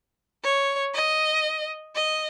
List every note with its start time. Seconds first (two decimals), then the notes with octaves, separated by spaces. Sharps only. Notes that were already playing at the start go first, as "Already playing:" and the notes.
0.43 C#5
0.94 D#5
1.96 D#5